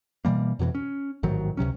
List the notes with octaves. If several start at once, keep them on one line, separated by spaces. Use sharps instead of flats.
B2 E3 G3 A#3
F2 B2 D3 E3
C#4
A1 G#2 D#3 F#3
C#2 C3 F#3 C#4